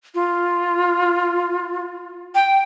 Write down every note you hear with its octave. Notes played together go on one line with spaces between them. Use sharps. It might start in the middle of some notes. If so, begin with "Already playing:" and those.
F4
G5